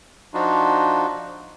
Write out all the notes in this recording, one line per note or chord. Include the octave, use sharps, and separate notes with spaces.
F3 D4 D#4 F4 F#4